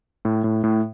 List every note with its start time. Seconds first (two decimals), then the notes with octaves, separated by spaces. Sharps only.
0.25 A2
0.44 A2
0.64 A2